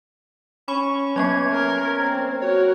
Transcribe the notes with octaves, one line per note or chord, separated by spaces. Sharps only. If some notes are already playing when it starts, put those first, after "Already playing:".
C#4 B5 C#6
F#3 A#3 B3 C#4 G#6
A#4
C4
F#4 A#4 C#5